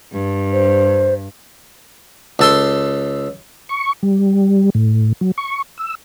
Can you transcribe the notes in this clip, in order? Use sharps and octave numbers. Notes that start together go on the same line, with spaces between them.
G2
C5
C#2 A4 C6
C#6
G3
A2
F#3
C#6
E6